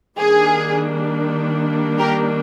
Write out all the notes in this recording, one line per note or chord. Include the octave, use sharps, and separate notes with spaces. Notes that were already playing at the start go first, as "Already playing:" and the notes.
D#3 G3 A#3 D4 G#4
G4 A#4